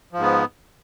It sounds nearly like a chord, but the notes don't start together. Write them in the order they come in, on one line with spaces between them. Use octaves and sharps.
F3 G#2 B3